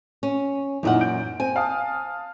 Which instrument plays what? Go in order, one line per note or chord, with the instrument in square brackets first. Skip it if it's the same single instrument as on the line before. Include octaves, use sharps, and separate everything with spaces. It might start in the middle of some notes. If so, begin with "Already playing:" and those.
[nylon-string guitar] C#4
[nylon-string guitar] F#2 A#2 F#5 [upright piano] E3 D#4 F4
[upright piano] G6 D7
[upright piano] C4 [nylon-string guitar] G#5
[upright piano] F5 A5 D#6